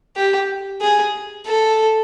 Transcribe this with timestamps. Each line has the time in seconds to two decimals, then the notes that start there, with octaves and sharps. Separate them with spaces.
0.16 G4
0.82 G#4
1.46 A4